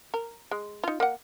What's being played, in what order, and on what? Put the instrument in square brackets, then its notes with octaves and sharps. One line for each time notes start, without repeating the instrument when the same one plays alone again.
[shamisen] A#4
G#3
D#4 F4
A#3 F#5